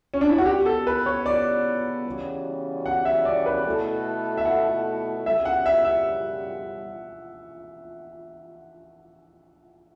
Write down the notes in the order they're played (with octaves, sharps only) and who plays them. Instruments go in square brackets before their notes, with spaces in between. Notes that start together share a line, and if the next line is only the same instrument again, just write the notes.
[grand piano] C#4
D4
E4
F#4
[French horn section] C#3 G3 B3 [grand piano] G4
[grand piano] A4
B4
C#5
D5
[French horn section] E2 C#3 G3 C#4 F#4
[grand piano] F#5
E5
D5
B4
[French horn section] B2 A3 E4 A4
[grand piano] E5
F#5
[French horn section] F#2 C#3 G3 [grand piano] E5
[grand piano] F#5
E5
E5